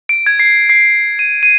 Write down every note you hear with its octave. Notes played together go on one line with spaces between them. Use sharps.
D7
G#6
C7
C7
D#7
D#7